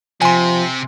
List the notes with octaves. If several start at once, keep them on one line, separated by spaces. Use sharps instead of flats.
C3 F3 G#5 C6